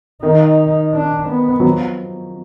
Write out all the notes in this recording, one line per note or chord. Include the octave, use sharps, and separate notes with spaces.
D#3 D#4
D4
B3
F#3
F3